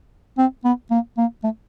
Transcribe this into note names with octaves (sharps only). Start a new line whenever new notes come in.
C4
B3
A#3
A#3
A3